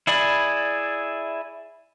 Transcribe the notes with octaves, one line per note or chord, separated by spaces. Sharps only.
E4 G#4 D5 B5